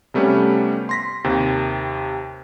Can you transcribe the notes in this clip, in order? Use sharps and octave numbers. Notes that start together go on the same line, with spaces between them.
C3 G3 A3 B3 C#4
C6 A#6 B6
D#2 C3